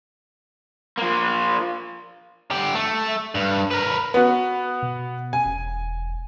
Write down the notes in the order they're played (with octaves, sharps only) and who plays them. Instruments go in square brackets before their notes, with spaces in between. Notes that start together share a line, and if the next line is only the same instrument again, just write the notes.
[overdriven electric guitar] F3 A#3
D3 G4
A3
G2
A#4 B4
[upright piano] B3 F#4
[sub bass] B2
[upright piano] G#5
[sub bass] E1